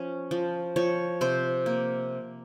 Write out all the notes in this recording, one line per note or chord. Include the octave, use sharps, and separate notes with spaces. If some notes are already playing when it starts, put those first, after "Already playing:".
Already playing: F3 C#4
F3
F3 C#5
C3 C5
A#3